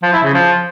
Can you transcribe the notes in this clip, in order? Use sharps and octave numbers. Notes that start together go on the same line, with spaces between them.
F3
E4
C#3
F3